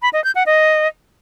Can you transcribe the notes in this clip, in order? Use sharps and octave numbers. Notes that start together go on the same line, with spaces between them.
B5
D#5
G6
F#5
D#5